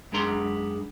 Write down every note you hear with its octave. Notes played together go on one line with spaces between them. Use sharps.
F#2 G#3 B3 D4 A#5 C6